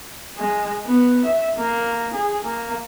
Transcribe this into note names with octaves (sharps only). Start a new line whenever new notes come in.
G#3
B3
E5
A#3
G#4
A#3